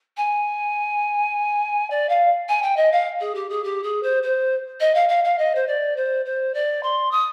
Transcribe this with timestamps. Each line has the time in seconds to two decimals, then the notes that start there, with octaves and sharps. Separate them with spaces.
0.17 G#5
1.90 D5
2.09 F5
2.49 G#5
2.62 G5
2.77 D#5
2.92 F5
3.20 G#4
3.35 G4
3.49 G#4
3.64 G4
3.83 G#4
4.03 C5
4.23 C5
4.80 D#5
4.95 F5
5.09 F5
5.24 F5
5.38 D#5
5.55 C5
5.67 D5
5.96 C5
6.25 C5
6.54 D5
6.83 C6
7.11 D#6